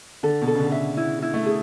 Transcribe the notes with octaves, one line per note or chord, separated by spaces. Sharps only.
D3 A4
B2
A4
C#3
D3
E5
E4
E4
A3
G#4